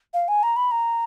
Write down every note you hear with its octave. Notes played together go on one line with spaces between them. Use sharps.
F5
G#5
A#5
B5
A#5